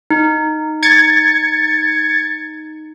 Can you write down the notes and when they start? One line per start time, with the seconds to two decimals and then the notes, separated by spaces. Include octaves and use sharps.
0.10 D#4
0.83 G#6 A6 C#7